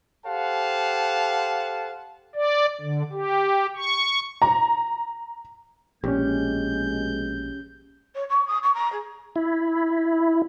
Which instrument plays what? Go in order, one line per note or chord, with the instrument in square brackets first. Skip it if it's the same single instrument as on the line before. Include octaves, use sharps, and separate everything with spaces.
[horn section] G4 A4 C5 F5 F#5 A5
[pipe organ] D5
D3
G4
C#6
[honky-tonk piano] A#5
[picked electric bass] A#1 [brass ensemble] B2 G#3 [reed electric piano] C#4 G4 [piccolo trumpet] G6
[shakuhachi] C#5
C#6
D#6
C#6
A#5
G#4
[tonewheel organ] E4